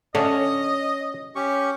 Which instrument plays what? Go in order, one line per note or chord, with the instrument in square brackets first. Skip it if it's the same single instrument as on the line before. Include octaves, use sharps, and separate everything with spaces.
[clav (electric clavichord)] D3 A3 D4 [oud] C#4 [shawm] D#5
[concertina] C#4 G4 C#6